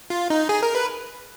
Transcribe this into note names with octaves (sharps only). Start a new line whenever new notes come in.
F4
D#4
G#4
A#4
B4